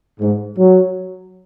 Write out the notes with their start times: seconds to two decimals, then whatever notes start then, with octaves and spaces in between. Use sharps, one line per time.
0.20 G#2
0.57 F#3